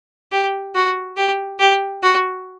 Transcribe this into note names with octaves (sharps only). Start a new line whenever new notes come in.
G4
F#4
G4
G4
F#4